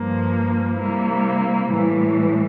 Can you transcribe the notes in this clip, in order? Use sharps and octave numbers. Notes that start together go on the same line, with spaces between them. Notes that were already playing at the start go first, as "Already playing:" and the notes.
Already playing: G2 F3 A#3
C3 G3 A#3 E4
A2 E3 G3